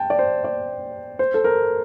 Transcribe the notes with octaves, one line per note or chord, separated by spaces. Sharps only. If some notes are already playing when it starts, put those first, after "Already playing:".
Already playing: G5 A5
D5
C5
D5
C5
A4
A#4